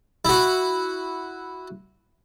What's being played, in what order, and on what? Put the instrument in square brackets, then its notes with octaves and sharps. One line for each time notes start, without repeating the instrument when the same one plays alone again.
[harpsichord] E4 F#4